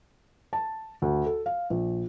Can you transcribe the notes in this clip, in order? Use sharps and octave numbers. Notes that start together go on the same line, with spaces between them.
A5
D2
A4
F5
A#1